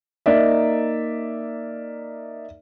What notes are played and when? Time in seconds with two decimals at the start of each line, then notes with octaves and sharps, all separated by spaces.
0.26 A#3 D#4 D5 E5